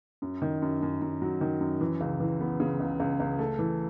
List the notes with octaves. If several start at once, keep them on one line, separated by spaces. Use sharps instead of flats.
F#2
D#3
F#2
F#2
F#2
F#3
D#3
F#2
E3
C#2
E3
B3
C#3
C#2
C#2
C#2
A3
E3